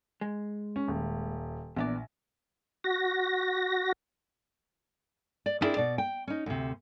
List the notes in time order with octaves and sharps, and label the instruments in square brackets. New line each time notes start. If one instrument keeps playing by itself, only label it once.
[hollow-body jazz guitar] G#3
[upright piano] C#4
D#1
[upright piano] A#1 [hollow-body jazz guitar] E2 B3 D5
[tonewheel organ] F#4 A#6
[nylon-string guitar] D5
B3 C4 D4 E4 G#4 A#4
B2 D5
G5
C#4 D#4
D2 C3